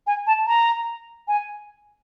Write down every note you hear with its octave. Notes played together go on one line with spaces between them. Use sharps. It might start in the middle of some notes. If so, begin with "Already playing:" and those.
G#5
A5
A#5
G#5